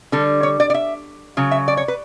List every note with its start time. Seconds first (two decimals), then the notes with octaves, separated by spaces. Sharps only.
0.12 D3 G3 A4
0.43 C#5
0.60 D5
0.70 D5
0.74 E5
1.37 C#3 F#3
1.51 E5
1.68 D5
1.77 C#5
1.88 B4